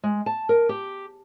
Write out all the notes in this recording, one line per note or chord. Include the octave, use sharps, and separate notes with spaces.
G#3
A5
A#4
G4